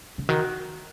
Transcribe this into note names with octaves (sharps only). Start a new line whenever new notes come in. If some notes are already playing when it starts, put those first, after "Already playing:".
C#3
D#3 F#4